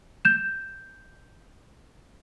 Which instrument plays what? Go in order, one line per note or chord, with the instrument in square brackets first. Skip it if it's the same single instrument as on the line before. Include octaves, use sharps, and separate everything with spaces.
[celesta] G6 E7